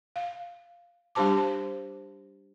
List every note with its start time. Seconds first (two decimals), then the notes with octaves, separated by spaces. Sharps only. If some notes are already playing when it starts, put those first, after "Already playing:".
0.16 F5
1.15 G3 D4 G4 C5 A5 D6
1.37 C5